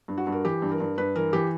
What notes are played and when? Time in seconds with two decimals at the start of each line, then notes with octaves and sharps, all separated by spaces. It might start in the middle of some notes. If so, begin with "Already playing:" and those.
0.08 G2
0.18 F#4
0.27 G2
0.32 A#4
0.45 E3 G4
0.62 G2
0.71 A#4
0.80 G2
0.98 G2 B4
1.16 E3 A#4
1.33 E3 G4